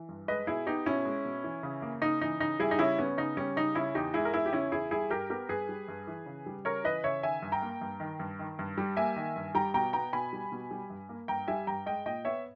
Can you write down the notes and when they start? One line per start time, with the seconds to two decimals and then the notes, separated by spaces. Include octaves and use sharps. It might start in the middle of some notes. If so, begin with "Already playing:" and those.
Already playing: E3
0.09 G2
0.28 G#3 B4 D#5
0.47 B2 E4 G#4
0.67 B3 D#4 G4
0.86 B2 C#4 E4
1.05 G#3
1.25 B2
1.44 E3
1.63 C#3
1.82 A#3
2.02 C#3 D#4
2.21 E3 D#4
2.40 C#3 D#4
2.60 G3 E4 G#4
2.71 D#4
2.79 C#3 C#4 E4
2.98 B3 C#4
3.17 C#3 D#4
3.37 G3 C#4
3.56 C#3 D#4
3.75 C#3 C#4 E4
3.95 E2 D#4 G4
4.14 G#3 E4 G#4
4.25 A#4
4.33 E2 E4 G#4
4.46 G4
4.53 C#3 C#4 E4
4.72 E2 E4 G#4
4.91 G3 E4 G#4
5.10 G2 G4 A#4
5.30 B3 G4 A#4
5.49 G2 G#4 B4
5.69 G3
5.88 G2
6.07 E3
6.26 C#3
6.46 G3
6.65 C#3 A#4 C#5
6.84 E3 B4 D#5
7.04 C#3 C#5 E5
7.23 D#3 E5 G#5
7.42 G2
7.52 G5 A#5
7.62 A#3
7.81 G2
8.00 D#3
8.20 G2
8.39 D#3
8.59 G2
8.78 G3
8.97 A#3 E5 G#5
9.16 D#3
9.36 G2
9.55 G3 G5 A#5
9.74 B2 G5 A#5
9.93 B3 G5 A#5
10.13 B2 G#5 B5
10.33 G3
10.52 B2
10.71 G3
10.90 G2
11.09 A#3
11.28 G2 G5 A#5
11.48 G3 E5 G#5
11.67 G2 G5 A#5
11.86 G#3 D#5 G5
12.06 A#2 D#5 G5
12.25 B3 C#5 E5